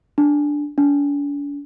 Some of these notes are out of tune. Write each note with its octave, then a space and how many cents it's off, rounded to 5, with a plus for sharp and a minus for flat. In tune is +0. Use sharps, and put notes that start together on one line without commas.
D4 +0
D4 -45